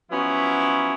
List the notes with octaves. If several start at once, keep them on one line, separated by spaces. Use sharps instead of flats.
F3 F#3 B3 C#4 E4